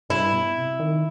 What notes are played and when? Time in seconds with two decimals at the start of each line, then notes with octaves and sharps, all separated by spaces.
0.10 G2 E4
0.33 B2
0.57 C3
0.80 D#3